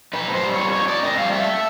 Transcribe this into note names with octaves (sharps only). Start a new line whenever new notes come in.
D#4 B4
C4
C5
G3
C4 C#5
D#4 C#5
D#4 D5
C4 D#5
G3 F5
A3 E5